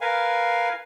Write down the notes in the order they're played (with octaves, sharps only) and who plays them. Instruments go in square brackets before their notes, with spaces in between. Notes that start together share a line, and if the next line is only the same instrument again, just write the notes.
[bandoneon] A#4 B4 F5 G#5